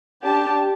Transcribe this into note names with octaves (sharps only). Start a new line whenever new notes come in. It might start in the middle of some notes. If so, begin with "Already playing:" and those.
D4 G4 A5